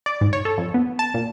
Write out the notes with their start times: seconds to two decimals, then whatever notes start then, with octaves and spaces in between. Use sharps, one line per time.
0.06 D5
0.21 G#2
0.33 C#5
0.45 A4
0.58 F2
0.74 B3
0.99 A5
1.14 A#2